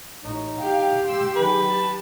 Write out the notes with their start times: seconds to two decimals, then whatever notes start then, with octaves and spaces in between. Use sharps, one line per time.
0.24 A1 D#4 C#5
0.60 G4 F5 G5
1.04 C6 E6
1.36 D#3 F#3 G#4 B4
1.66 A5